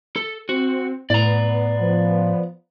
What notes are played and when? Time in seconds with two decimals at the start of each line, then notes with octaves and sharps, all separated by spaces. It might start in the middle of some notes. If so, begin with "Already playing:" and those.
0.16 A4
0.49 C4 F#4
1.10 A2 B3 D5 A#5
1.81 F3